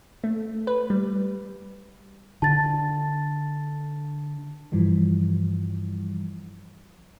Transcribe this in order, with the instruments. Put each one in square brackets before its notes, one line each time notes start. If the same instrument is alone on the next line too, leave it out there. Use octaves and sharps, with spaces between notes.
[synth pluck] A3
B4
G3
[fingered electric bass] D3 [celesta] A5 A6
[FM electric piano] G2 E3 F3 G3